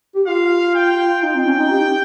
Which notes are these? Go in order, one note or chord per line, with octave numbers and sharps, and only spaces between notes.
G4
F4 F5
G5
D#4 G5
C4
C#4
D#4
G4